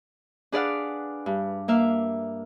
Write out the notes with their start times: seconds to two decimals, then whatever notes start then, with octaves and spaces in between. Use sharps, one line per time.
0.52 D4 G#4 B4 D5 F5 F#5
1.26 G2
1.68 A#3 E5 F5